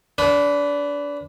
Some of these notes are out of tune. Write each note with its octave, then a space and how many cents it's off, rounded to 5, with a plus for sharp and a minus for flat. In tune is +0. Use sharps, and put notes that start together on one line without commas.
D4 -25 B4 +10